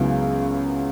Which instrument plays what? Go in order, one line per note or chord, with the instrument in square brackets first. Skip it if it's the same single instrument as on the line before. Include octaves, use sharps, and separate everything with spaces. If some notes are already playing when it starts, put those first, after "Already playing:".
Already playing: [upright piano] C#2 C#3 F#3 B3 E4